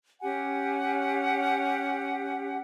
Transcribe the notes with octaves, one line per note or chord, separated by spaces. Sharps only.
C#4 G4 F#5 G#5